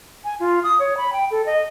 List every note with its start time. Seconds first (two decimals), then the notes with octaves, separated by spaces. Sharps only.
0.24 G#5
0.40 F4
0.63 D#6
0.79 C#5
0.97 B5
1.13 G5
1.31 A4
1.46 D#5